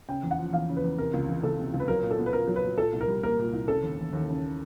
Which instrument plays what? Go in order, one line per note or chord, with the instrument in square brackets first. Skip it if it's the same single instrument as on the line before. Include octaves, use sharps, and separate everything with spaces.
[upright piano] C#3 [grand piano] G5
[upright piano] E2
[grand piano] F#5
[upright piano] F3
[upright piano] E2 [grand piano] F5
[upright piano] C#3
[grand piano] B4
[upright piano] E2
[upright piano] C3 [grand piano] A#4
[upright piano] C#2
E3
[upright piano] C#2 [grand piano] A4
[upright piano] C3
C#2
[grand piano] B4
[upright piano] F#3 [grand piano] A#4
[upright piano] A#2
[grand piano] A4
[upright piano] B3
[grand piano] B4
[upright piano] A#2 [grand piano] A#4
[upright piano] F#3
[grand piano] B4
[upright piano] A#2
[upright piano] A#2 [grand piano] A4
[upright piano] C2
[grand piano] A#4
[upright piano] G3
[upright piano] A#3 [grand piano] A#4
[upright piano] A#2
C2
[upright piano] C#3 [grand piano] A4
[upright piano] D#2
E3
D#2
C#3